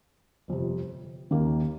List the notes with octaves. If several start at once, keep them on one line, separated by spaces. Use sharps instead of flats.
G1 F2 C3
D#2 D#3 A#3